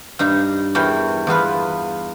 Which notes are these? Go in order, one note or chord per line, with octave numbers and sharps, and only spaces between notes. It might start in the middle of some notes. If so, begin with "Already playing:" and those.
G2 D#4 A#5
E2 E3 A#4 C#5 G5
E2 B3 F4 B4